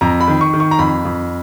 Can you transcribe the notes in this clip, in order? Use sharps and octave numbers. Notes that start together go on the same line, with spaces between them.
F2 A#5
B5
D#3
C#6
D#3
C#6
A#5
F2 B5
F2